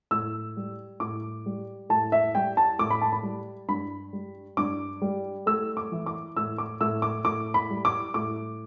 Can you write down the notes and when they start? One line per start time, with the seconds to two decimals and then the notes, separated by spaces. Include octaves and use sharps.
0.11 A2 E6
0.57 G3
1.00 A2 D6
1.46 G3
1.89 A2 A5
2.12 E5
2.35 G3 G5
2.57 A5
2.79 A2 D6
2.91 B5
3.01 A5
3.12 B5
3.23 G3
3.68 G2 B5
4.13 G3
4.57 G2 D6
5.02 G3
5.46 A3 E6
5.77 D6
5.92 E3
6.06 D6
6.36 A2 E6
6.58 D6
6.80 A2 E6
7.02 D6
7.25 A2 D6
7.54 B5
7.70 G3
7.85 D6
8.14 A2 D6